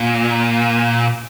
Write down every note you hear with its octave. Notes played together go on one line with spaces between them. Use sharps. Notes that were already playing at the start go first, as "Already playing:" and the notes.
Already playing: A#2